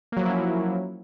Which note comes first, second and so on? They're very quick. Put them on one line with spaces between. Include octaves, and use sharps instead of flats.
A#3 F#3 F3 E4 C#4